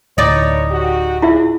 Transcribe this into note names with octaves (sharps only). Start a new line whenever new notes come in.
D1 A2 D#4 C#5 D5
F#4 G4
C#4 D4 E4 F4 G#4 E5